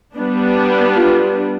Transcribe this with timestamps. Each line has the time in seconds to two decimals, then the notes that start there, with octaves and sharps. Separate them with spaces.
0.17 G3 B3 D4
0.96 F4